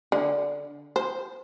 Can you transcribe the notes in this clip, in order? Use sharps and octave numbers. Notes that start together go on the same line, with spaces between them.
D3
C5